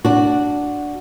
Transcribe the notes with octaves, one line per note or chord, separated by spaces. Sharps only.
D4 F#4